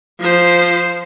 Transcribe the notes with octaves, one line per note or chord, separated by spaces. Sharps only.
F3 C5